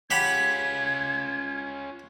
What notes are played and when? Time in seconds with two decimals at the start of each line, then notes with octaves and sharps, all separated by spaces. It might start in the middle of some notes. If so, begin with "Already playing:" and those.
0.11 C#4 F4 G4 F#5 B5 G#6